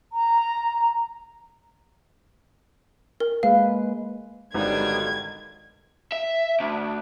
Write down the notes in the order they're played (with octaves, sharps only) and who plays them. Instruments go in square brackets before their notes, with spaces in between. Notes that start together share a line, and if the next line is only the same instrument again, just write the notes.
[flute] A#5
[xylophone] A#4
[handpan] G#3 A#3 B4 [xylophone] F5
[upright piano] G#1 [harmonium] D3 D#3 F#3 [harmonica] G3 B3 D4 [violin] G#6
[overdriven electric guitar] E5
D2